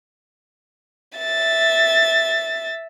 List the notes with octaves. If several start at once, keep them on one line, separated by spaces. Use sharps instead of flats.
E5 A6